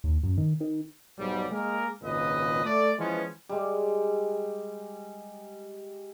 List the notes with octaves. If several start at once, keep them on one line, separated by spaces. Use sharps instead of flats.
D#2
F#2
D#3
D#3
B1 G#2 G3
G#3 A#3 G#4 A#4
G#1 C#2 A#2 B4 D#5
A3 D5
E3 F3 G#3 B3 C#4
G3 G#3